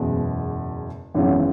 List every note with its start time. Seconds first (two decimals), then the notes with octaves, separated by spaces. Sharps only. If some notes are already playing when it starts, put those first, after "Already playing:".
Already playing: F#1 E2 B2 G#3
1.14 G#1 F#2 C#3 E3 B3